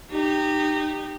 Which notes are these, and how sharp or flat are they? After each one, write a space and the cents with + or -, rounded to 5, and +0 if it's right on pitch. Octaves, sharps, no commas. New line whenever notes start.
D#4 -25 G4 -5